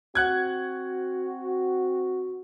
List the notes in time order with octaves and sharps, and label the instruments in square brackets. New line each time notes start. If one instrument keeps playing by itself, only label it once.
[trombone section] C4 F#4 [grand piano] F#5 F#6 G#6